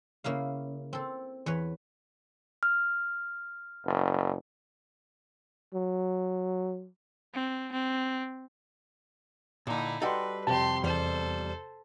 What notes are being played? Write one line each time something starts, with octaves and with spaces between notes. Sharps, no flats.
C#3 A#3 E4 F5
C4 A4
E2 B4 C#5
F6
F#1
F#3
C4
C4
A#2 D3 D#4 E4
G3 F#4 A4 B4 D#5 G5 C6
F2 C3 G4 A5 C6
E2 G3 A4 C5 F5